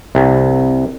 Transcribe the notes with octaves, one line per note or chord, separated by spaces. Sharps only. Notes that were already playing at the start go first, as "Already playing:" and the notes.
C2